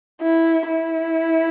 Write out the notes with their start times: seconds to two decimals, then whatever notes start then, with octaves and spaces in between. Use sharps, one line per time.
0.21 E4
0.67 E4